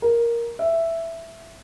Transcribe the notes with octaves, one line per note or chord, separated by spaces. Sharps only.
A#4
E5